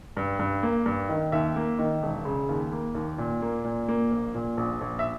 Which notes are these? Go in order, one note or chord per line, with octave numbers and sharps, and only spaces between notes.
G2
G2
A#3
G2
D#3
D#2 E5
A#3
D#3
E1
C#3
D#2
A#3
D#2
A#2
A#3
A#2
A#3
A#1
A#2
A#1
A#1
E5